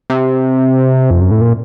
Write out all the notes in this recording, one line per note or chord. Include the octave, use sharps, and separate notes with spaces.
C3
F2
F#2
A2
A#2